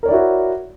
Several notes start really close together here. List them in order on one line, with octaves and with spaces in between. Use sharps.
A#4 C#5 D5 E4 F#4